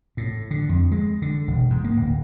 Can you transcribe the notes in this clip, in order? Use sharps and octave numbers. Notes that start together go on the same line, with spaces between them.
A2
D3
F2
G#3
D3
E1
G#2
A#3
D1